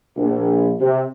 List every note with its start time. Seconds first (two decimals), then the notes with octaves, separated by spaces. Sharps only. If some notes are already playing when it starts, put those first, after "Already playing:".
0.16 A#1
0.80 C3